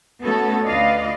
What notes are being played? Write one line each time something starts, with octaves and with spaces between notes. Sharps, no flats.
A3 B3 C#4 F#4 A4
D2 F4 B4 D5 D#5 F5